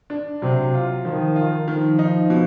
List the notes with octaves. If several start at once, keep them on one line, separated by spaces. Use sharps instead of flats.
D4
C3 F#3
F4
D#3 F3
F4
D#3 F3
D#4
B2